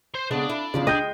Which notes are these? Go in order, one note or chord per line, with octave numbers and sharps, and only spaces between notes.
C5 C6
C#3 G#3 B3 D4
E4
E2 C#3 F3 F4 D5
G#3 D#5 G5 G6